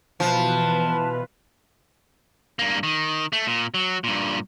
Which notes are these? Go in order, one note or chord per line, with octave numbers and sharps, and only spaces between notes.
B2 E3 F3 B4 A5
G2 A#3
D#3
A3
A#2
F#3
G2 A#2